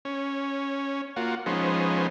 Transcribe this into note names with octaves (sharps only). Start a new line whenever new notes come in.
C#4
A#3 F4 F#4
F3 G#3 B3 C#4 D#4 C5